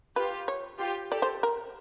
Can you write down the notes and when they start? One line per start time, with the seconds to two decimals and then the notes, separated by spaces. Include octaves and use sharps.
0.16 F4 G4 B4
0.48 C#5
0.80 F4 G4
1.11 G4 A4 D5
1.22 C5
1.43 A#4